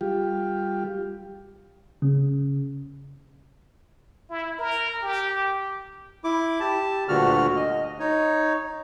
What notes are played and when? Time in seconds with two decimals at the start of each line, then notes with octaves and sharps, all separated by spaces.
0.01 G3 F4 G4
2.02 C#3
4.30 E4
4.58 A#4
5.02 G4
6.24 E4 D6
6.60 G4 A5
7.08 D2 G2 A#2 D3 F#4 F6
7.56 D#5
7.99 D#4 C#5